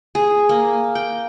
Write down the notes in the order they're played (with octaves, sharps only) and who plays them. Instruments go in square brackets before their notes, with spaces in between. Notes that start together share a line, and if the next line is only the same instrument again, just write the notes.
[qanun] G#4
A#3
G5